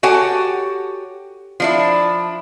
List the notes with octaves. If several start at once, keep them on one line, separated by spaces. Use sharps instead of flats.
F#4 G4 A4 C#5 F#5 G#5
F3 D4 E4